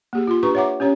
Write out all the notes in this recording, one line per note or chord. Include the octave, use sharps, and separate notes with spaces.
A#3 G4 G#4
F4 C6
D4 G4 B4 A#5 C#6
C#5 E5 F#5 A#5 D6
C#4 G4 C#5 A#5